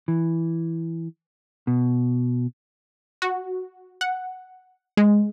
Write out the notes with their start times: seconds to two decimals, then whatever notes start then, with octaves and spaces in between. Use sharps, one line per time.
0.08 E3
1.67 B2
3.22 F#4
4.01 F#5
4.97 G#3